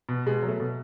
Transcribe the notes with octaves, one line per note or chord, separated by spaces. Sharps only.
B2
B2 G#3
F#3
A3
B2